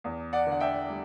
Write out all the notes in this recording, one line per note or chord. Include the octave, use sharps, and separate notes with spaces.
E2
D5 F#5
D3 F#5
E5 G5
G3